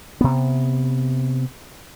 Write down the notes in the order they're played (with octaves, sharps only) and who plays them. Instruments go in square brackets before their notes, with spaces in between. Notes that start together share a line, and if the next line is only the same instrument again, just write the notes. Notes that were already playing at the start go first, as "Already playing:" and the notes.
[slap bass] C3 B3